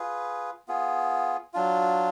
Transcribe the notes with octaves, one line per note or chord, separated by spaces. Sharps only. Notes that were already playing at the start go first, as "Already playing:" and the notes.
Already playing: F4 G#4 B4
B3 F4 G#4
F#3 D4 F4